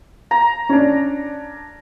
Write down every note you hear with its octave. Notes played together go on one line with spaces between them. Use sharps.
A#5
C#4 D4